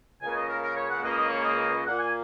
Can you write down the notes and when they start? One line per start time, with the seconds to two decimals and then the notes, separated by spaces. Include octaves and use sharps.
0.21 C#2 C#3 A#3 G#5
0.35 D#5
0.49 A#4
0.62 A#4
0.76 C#5
0.90 F#5
1.02 C#2 C#3 A#3 D#5
1.17 D#5
1.30 C#5
1.44 D#5
1.84 A#2 A#3 F#5
1.99 G#5